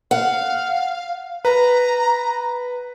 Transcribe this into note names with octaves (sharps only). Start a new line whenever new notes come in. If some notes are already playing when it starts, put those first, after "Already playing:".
F5 F#5
B4 A#5